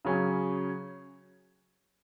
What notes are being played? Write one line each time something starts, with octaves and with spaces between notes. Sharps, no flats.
C#3 F#3 C#4 G#4